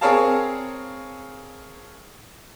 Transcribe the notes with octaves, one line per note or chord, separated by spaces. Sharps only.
C4 G#4 A#4 C#5 F5 A5